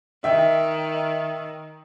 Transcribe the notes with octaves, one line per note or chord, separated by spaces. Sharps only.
D#3 E5 G5